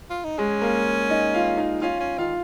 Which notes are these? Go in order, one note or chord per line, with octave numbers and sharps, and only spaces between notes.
F4
D#4
G#3 C#4 G#4
A#3 A#4
D#4 D#5
F4 F5
D#4 D#5
C#4 F4 F5
C#4
D#3 F4 F5